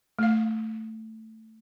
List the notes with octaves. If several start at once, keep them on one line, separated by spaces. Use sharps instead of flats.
A3 F5